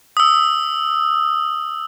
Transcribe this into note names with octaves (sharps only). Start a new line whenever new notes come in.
D#6 E6